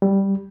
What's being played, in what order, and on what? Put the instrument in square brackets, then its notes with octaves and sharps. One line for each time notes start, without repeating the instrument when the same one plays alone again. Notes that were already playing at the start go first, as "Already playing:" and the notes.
[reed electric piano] G3